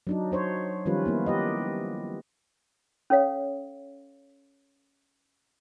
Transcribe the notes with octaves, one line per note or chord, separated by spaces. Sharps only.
F#3 D4 D#4
D4 C5 C#5
D#3 F3 G3 C#4 F4 B4
A#3 B3 E4
G4 B4 D#5
C#4 A4 C#5 F5